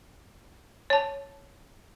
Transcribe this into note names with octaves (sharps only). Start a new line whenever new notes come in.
C#5 A5